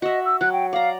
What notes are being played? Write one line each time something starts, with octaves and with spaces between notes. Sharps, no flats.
F#4 D#5 E5
E6
F#3 F#6
G5
D5 F5 A#5